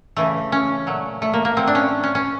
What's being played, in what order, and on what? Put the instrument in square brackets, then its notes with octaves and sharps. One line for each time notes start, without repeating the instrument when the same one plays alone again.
[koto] C#3 E3 A3
C#4
A#2 F#3 A3
A3
A#3
A#3
A2 F#3 A3 C4
D4
C#4
C#4
C#4